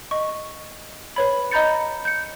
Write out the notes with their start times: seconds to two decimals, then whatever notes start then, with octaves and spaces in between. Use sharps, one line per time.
0.11 D#5 C#6
1.16 B4 C#5 B5
1.51 D#5 A#5 B5 G6 A6 C#7
2.05 G6 C#7